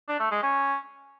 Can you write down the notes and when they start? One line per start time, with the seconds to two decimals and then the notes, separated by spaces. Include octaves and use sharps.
0.08 D4
0.19 A3
0.31 G#3
0.43 C#4